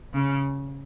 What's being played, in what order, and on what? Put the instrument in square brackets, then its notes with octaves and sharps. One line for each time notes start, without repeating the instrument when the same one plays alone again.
[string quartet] C#3